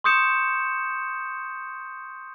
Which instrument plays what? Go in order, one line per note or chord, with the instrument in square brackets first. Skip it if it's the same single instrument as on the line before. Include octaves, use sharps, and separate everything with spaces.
[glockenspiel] C6 C#6 D#6 G6 C#7 E7